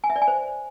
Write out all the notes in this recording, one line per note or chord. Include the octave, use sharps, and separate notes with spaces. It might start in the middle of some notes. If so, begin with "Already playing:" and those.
G#5
E5
D5
G#5
C5